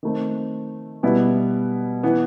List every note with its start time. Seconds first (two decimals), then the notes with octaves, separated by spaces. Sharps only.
0.03 D#3 A3 C4
1.03 B2 G3 B3 E4
2.03 E3 B3